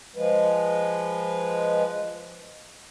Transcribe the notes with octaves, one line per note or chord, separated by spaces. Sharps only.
F3 G#3 B4